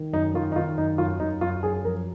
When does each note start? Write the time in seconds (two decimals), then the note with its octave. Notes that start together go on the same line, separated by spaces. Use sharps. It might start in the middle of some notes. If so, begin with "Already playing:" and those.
Already playing: D#3
0.13 F#2 D#4
0.34 D#3 F4
0.52 D#4
0.56 D#3 F4
0.77 F#2 D#4
0.98 F#2 F4
1.20 F#2 D#4
1.41 F#2 F4
1.63 F#2 G#4
1.84 F3 A#4